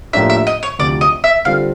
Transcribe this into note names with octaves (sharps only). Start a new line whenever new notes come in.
A2 F3 A#3 D4 G4 E5
E5
D#5
C#5
D2 C3 F3 D5
D#5
E5
D3 G3 C4 F4 A4 F5